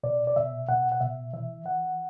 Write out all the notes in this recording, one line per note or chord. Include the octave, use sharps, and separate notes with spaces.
B2 D5
D5
B2 E5
B2 F#5
F#5
B2 E5
E3 E5
E3 F#5